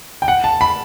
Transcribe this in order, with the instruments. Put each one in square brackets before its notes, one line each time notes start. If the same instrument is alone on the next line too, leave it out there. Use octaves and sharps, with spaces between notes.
[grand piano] G5
F#5
A5
B5